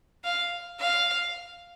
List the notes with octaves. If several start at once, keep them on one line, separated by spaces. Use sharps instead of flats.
F5
F5